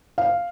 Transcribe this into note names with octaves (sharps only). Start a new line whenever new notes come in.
F5